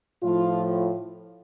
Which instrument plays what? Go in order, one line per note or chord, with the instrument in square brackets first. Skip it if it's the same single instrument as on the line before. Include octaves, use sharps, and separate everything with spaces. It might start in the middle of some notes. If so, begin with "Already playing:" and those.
[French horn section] A2 F3 F4